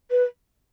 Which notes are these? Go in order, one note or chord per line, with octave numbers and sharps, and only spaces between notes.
B4